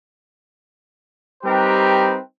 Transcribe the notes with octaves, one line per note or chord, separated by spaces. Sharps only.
G3 C4 D#4 G4 A#4 B4